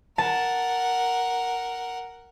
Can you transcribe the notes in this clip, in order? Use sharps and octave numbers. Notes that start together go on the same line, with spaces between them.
A#4 F#5 A5